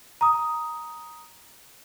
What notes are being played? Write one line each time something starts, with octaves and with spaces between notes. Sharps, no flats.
A#5 D#6